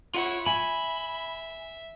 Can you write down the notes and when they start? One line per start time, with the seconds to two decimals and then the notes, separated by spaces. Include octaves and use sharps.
0.14 E4 F4 C#5 F#5
0.46 E5 G#5 B5